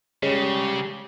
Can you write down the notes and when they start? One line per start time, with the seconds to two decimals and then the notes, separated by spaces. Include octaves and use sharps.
0.23 C#3 G3 G#3 C#4